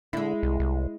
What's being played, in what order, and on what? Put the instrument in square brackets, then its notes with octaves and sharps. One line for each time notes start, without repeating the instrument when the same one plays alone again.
[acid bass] D3 [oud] G#3 E4
[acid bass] C2
C2